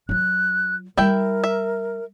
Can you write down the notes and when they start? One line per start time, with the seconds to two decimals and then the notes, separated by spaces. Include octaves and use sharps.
0.09 F#3 F4 F#6
0.97 G3 E4 A#4 E5 G5
1.44 E5